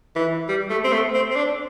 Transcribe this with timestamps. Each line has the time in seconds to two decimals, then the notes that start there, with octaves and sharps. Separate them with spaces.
0.16 E3
0.49 G3
0.70 A3
0.84 C4
0.92 A3
1.14 C4
1.31 C4
1.36 D4